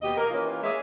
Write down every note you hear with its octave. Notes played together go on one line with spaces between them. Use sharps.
D#2 B2 G4 D#5
A#3 A#4
E3 A#3 C#4 D#4 F4
G#3 A#3 G#4 C#5 E5